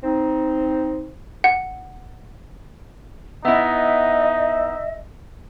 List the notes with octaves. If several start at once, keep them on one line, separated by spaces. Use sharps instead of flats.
C4 D#4
F#5
B3 D#4 E4 D#5 E5